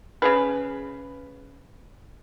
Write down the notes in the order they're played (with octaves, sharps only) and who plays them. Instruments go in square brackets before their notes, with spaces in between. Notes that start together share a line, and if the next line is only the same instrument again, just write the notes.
[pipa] C#3 G#4 B4